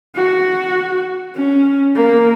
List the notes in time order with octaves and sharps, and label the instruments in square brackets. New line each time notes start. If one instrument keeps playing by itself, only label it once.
[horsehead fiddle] F#4
C#4
A#3